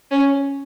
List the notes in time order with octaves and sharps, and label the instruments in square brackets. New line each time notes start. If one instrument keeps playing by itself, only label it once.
[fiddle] C#4